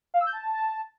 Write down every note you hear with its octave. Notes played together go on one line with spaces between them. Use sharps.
F5
E6
G6
A5